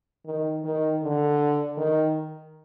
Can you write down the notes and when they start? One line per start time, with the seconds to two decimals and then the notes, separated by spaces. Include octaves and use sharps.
0.26 D#3
0.64 D#3
1.02 D3
1.78 D#3